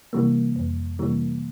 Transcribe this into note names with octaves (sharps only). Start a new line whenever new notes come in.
C3 E3 G3 A#3
F2
C3 E3 G3 A#3